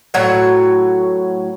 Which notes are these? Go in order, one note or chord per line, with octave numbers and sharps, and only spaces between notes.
A2 F#3 C#5 F#5